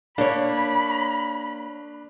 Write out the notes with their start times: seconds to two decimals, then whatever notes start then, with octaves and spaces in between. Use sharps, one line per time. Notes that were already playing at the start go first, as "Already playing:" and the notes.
0.18 A#3 D4 C#5 B5